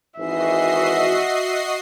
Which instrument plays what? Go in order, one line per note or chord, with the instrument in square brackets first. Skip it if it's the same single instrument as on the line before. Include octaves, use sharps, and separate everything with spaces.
[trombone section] G#1 E3 [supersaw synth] F#4 D#5 C7 [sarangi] E5